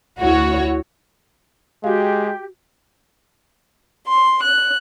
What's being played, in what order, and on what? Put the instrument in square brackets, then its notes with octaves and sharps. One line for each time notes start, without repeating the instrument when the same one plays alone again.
[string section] D2 E4 F#4 C#5
[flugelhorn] G#3 [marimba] F#4 F5 [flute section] G4
[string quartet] C6
F#6